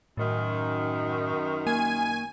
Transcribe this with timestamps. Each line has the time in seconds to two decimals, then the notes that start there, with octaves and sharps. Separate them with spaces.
0.17 F#2 A2 D#3
1.67 A#3 G#5